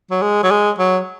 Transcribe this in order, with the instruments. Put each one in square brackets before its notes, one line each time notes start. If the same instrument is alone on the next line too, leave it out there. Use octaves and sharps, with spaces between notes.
[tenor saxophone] F#3
G#3
F#3
G#3
F#3